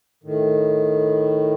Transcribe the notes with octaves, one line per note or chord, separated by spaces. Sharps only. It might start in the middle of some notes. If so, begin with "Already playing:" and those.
A2 D#3